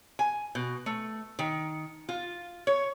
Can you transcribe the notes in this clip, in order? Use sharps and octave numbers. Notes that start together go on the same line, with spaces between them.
G#5
B2
A3
D#3
F4
C#5